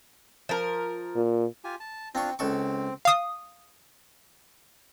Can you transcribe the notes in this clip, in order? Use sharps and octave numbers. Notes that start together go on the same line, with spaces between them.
F3 A#4
A#2
F4 G4 G#5
A5
C4 D4 F4 C#6
C#2 C4 A4 C#6
F5 D#6